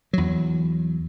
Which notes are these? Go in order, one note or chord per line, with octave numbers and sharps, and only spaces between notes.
E2 F#3